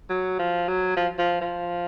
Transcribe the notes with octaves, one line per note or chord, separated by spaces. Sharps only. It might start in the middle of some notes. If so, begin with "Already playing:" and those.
F#3
F3
F#3
F3
F3
F3